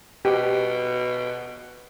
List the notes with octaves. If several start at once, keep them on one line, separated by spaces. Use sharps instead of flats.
B2 G4